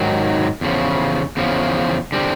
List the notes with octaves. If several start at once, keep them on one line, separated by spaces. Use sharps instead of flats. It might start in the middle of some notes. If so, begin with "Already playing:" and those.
Already playing: G#2 D#3 F#3
E2 C#3 F3
E2 C#3 F3
D3 G3 C4